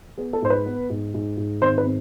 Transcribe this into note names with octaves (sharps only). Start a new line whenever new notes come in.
B3 G#4
A4
G#2 C5
B4
B3
G#2
G#2
G#2
G#1 C5
B4
C4